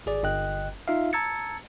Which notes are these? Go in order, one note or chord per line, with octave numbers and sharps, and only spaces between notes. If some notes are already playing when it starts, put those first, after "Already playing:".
G#1 G#4 D5
G1 D#5 G5 F#6
D#4 F4 E5 F5
A5 A#5 E6 G#6 A6 C#7